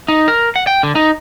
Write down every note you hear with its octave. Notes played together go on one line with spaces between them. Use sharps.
D#4
A#4
F#5
G5
D3
D#4